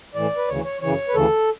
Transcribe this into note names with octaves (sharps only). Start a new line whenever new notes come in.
A2 E3 D5
B4
D2 C#3 E3 C#5
C#5
F#2 C#3 E3 C#5
B4
D2 C#3 E3 A4